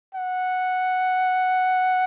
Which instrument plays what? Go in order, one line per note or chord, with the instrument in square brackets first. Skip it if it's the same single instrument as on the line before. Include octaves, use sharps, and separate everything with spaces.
[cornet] F#5